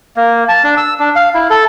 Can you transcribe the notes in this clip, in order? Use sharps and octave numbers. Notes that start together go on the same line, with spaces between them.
A#3
A5
D4
E6
D4
F5
E4
A4